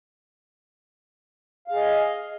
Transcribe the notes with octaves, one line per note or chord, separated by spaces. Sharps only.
G#4 D#5 F5